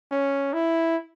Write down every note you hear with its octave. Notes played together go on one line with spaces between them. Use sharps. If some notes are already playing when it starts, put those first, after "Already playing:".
C#4
E4